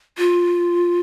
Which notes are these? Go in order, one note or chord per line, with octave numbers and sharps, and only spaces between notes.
F4